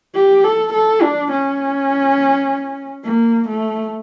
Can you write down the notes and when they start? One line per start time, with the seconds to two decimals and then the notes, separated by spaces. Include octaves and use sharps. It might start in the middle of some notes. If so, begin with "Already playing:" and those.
0.15 G4
0.44 A4
0.73 A4
1.02 D4
1.32 C#4
3.04 A#3
3.49 A3